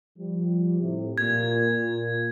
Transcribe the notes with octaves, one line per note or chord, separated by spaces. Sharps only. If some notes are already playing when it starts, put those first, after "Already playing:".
F3 G3
A2 C3
A#2 G#6